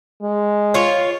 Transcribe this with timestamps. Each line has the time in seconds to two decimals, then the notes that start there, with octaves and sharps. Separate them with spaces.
0.22 G#3
0.74 F4 C#5